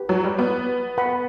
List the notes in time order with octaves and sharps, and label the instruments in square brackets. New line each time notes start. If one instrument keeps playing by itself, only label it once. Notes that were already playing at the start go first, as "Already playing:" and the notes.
Already playing: [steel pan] G4 B4
[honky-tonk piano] F#3
G3
B3
[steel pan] B4 F#5 B5